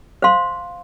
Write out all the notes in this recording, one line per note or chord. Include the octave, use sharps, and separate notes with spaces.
C5 F5 C6